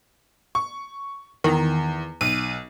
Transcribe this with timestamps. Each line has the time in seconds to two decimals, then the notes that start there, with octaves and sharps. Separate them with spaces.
0.55 C#6
1.44 E2 D#3
2.21 B1 D#7